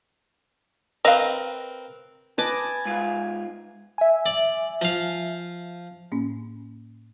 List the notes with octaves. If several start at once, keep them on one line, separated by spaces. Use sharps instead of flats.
C4 A#4 B4 D#5 F5
B4 D#5 G#5 A5 D6
G#2 F4
E5 G#5
D5
F3 F5
A2 A#3 C#4